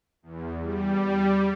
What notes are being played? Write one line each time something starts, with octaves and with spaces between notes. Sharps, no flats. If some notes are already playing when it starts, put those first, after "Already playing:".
E2
G3